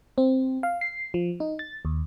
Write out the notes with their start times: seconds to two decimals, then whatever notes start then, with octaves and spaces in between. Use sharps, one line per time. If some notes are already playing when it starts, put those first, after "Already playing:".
0.18 C4
0.63 F5
0.81 C7
1.14 F3
1.40 D#4
1.59 A6
1.85 D#2